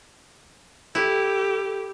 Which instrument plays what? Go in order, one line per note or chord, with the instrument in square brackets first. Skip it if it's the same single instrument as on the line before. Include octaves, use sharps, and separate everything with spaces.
[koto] E4 [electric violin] G4 [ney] A4